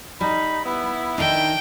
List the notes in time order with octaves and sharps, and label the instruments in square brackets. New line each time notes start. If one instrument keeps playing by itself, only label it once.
[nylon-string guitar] G3 [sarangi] D#4 [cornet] B5
[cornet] B3 [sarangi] E4
[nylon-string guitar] D#3 D#4 [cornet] D4 [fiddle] G5